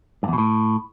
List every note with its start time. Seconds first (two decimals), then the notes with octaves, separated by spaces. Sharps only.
0.23 G2
0.28 E2
0.33 B2
0.38 A2